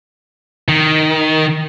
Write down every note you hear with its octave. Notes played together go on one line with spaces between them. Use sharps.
D#3